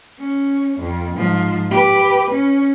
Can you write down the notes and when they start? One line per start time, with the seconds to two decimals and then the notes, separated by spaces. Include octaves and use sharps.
0.19 C#4
0.80 F2
1.16 G#2 F3
1.71 G4 B4
2.31 C#4